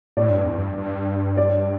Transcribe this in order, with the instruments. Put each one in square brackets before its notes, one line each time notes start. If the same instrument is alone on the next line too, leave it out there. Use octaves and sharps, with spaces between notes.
[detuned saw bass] A2 [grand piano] D5
[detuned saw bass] G2
E2
G2
G2
[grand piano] D5